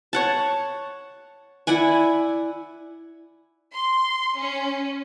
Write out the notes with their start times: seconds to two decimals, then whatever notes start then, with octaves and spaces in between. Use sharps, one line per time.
0.13 C#5 F#5 A5
1.67 E4 D5 F#5 G#5
3.74 C6
4.39 C#4